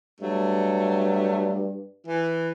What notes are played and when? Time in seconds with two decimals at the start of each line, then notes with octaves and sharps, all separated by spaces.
0.21 G2 F#3 A3
2.07 E3